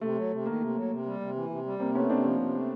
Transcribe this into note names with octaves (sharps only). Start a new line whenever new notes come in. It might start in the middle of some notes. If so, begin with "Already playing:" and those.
C3 A3
F#3
C3
D#3 A#3
C3
F#3
C3
G3
C3
E3
C3
G3
C3 A#3 C4
A3 B3 C#4
C3 C4 D4
F3
C3
A3